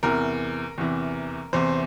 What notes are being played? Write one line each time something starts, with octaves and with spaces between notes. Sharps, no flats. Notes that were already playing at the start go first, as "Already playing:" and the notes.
E2 C3 E3 A#4
E2 C3 E3
E2 C3 E3 C5